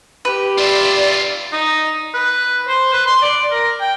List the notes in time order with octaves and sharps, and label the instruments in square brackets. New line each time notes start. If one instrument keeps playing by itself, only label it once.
[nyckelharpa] G4 [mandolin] B4
[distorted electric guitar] F4 E5 [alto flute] D5
[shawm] D#4
B4
C5
B4
C6
D5
A#4
G5